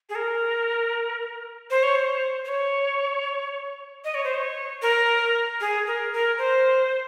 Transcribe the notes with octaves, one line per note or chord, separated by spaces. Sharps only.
G#4
A#4
C5
C#5
C5
C5
C#5
D#5
C#5
C5
C#5
A#4
G#4
A#4
A#4
C5